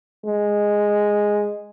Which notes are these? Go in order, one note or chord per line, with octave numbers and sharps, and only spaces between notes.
G#3